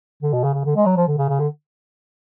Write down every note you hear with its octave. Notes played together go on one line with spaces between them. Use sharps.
D3
B2
C#3
C#3
D3
G#3
F#3
F3
D3
C#3
C#3
D3